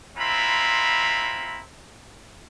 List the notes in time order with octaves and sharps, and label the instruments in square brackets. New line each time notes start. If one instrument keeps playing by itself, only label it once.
[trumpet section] G#3 C4 E4 F4 A#5 B5